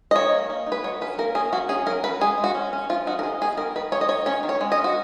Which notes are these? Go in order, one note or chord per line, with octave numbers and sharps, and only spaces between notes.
D#5
D#3 C#5
A#3
A#3
D#4
B4
F#3 C#5
C#4 B4
A#3 A#4
C#4 G#4
F#3 F#4
C#4 G#4
F#3 A#4
F#3 B4
G#3 G#4
G#3
F#4
C#4
C#4
F3 F4
D#4 F#4
A#4
D#4 G#4
B3 G#4
D#3 A#4
D#3 B4
D#4 C#5
D#5
D#4 C#5
C#4 C#5
D#3
C#5
G#3
D#5
C#4
F#4